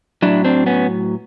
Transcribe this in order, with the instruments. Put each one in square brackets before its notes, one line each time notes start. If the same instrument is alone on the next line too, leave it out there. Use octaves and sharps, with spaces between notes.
[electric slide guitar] A2 F#3 D4 E4
C4 D4
B3 C#4